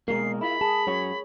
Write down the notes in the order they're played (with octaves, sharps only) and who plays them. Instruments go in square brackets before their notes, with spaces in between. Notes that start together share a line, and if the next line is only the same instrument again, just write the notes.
[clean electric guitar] B2 G#3 A#3 [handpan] G#4 A#4 [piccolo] C7
[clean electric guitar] E4 F4 [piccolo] B5
[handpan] G#4 [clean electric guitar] A5
[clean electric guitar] F#2 F#4 [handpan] C#5